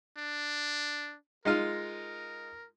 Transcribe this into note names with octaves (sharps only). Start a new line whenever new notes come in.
D4
G#3 D#4 F4 A#4